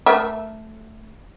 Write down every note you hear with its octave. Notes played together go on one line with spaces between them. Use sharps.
A3 A#4 E5